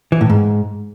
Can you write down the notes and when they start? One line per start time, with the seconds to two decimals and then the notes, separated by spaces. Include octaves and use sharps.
0.12 E3
0.21 A2
0.30 G#2